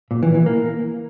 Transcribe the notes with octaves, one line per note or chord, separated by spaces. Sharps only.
A#2
E3
E3
A#3